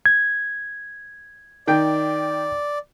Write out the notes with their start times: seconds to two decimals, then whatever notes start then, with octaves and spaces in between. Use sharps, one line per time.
0.06 G#6
1.67 D#3 D5 G5